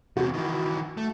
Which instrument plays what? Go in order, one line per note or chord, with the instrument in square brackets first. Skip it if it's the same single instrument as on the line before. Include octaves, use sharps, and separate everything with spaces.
[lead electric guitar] E2 C3 [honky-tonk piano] F#4
[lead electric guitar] D#3 E3
A3